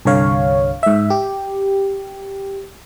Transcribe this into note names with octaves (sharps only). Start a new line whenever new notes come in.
C2 G2 D3 C#5 F5
G#2 E5
G4